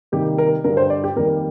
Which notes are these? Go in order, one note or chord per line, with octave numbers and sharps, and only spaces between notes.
C3 D#3 G3 A#3 G4
A#4
G2 D3 G3 A#4
C5
D5
G4
F2 D#3 G3 A#3 A#4